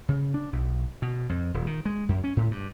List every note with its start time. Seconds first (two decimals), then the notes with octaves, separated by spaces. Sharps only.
0.09 C#3
0.34 D4
0.53 B1
1.02 B2
1.29 F2
1.54 D#1
1.67 D#3
1.85 G#3
2.09 F#2
2.24 C#4
2.37 A2
2.51 G2